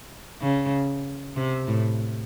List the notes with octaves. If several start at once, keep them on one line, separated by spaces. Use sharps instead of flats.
C#3
C3
A2